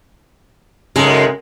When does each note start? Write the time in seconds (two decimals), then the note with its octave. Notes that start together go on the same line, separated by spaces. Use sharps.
0.96 F#2 C#3 G#3 D#4 A4